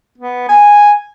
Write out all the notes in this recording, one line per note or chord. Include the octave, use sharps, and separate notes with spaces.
B3
G#5